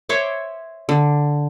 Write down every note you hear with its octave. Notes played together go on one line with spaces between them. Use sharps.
C5 C#5 E5 D6
D3